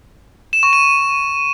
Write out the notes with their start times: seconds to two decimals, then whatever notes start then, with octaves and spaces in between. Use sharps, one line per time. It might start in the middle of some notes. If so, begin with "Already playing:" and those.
0.53 E7
0.63 C#6
0.73 D#7